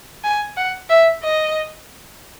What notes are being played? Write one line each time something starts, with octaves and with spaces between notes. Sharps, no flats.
G#5
F#5
E5
D#5